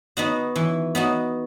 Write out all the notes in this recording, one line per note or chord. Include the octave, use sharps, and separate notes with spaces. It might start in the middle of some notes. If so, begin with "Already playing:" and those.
B3 D#4 F#4
E3
B3 D#4 F#4